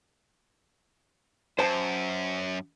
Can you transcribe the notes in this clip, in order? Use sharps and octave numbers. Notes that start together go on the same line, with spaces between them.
F#2 C5 A5